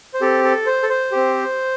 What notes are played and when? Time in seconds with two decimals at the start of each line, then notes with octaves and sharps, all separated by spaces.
0.14 C5
0.21 C4 G4 A4
0.44 A4
0.66 C5
0.83 A4
0.89 C5
1.12 C4 G4